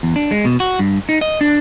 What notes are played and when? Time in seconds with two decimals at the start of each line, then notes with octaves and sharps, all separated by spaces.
0.03 E2
0.16 D4
0.31 G#3
0.45 B2
0.60 F#4
0.79 G2
1.09 D#4
1.21 D#5
1.41 D4